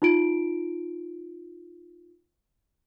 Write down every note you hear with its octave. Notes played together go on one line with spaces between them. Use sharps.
D#4 F4 D7